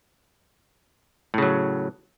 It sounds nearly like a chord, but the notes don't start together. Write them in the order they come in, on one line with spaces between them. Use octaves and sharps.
A2 C#3 F#3